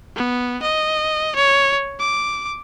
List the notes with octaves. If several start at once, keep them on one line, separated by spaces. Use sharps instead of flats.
B3
D#5
C#5
D6